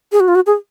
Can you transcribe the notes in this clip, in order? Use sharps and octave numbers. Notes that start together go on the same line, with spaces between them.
G#4
F#4
F4
F#4
G#4